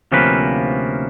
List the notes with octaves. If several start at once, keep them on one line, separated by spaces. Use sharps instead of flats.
D2 C3 F3 A#3 C#4 B4